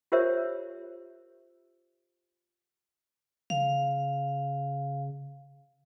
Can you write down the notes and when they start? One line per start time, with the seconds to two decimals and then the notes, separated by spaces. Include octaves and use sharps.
0.12 F4 G4 A#4 C5 C#5 E5
3.50 C#3 F5